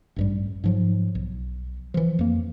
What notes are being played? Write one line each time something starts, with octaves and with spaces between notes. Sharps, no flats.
A1 G2 G3
G#2 F3 F#3
B1
E3 F3
F2 A#3